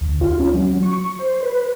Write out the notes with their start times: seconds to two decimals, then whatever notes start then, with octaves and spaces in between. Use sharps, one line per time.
0.01 D2
0.21 F4
0.39 C#4
0.54 F#3
0.83 C#6
1.19 C5
1.43 B4